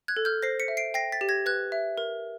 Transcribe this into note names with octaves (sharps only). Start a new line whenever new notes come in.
F#6 G#6
A4
F6 G6
C5 A#6 C7
B6 C#7
E5
C7 D7
G5 A#6 C7
A6 B6
G4
G#6 A#6
B4 F#6 G#6
E5
A#4